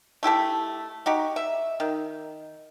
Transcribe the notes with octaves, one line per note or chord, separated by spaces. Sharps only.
A3 E4 G4 A4
D#4 F#4 G4
E5
D#3